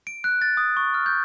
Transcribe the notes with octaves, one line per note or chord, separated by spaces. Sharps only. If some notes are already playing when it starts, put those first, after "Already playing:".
D7
F#6
A6
D#6
C#6
F6
G6